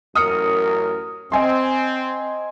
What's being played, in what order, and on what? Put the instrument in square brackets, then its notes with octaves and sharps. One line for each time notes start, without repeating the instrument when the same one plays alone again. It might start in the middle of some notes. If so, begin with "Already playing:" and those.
[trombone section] A1 F#2 A#4 [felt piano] D#6 F6 C#7
[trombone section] C4 [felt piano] D#5 G#5 C6